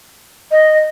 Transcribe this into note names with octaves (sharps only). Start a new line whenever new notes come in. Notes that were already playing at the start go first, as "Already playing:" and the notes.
D#5